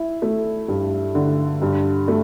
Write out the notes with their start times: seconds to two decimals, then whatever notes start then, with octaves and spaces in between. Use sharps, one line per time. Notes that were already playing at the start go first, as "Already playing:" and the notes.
Already playing: E4
0.22 A3
0.68 G2
1.15 D3
1.62 G2
2.08 A3